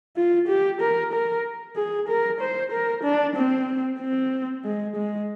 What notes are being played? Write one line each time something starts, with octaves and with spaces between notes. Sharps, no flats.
F4
G4
A#4
A#4
G#4
A#4
C5
A#4
D4
C4
C4
G#3
G#3